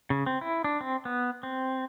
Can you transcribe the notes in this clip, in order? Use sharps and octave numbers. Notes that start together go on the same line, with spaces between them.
C#3
C4
E4
D4
C4
B3
C4